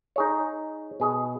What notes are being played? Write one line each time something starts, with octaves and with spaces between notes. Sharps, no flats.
D#4 G#4 C#5
B2 G#4 D#5